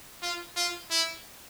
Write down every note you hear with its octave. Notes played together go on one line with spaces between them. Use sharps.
F4
F4
E4